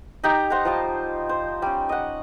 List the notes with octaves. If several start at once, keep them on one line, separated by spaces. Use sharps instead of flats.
D#4 G4 A#5
C5 F#5 A5 A#5
F3 G3 A5
C5
G3 C#4
D#5 F#5